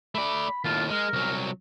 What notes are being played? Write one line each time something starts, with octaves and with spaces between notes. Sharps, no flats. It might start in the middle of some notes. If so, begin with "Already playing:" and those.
A3 D5 B5
D#2 A2 F4
G#3 A#4
C2 F#3